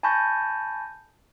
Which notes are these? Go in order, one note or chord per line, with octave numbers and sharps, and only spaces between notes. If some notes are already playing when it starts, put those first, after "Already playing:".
G#5 A5 B5 C#6 G6 A#6